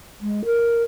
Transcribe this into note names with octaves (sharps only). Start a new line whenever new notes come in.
G#3
A#4